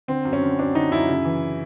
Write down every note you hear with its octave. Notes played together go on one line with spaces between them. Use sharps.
D3 C4
F#2
C#4
D3
F#2 D4
D3 D#4
F#2 E4
C#3
E3